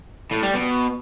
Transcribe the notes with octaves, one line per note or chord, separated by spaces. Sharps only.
A2
G3
B2